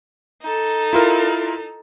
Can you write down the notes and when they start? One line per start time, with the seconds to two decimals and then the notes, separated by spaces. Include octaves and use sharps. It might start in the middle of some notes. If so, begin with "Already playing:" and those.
0.42 D#4 A4
0.93 E4 F4 A#4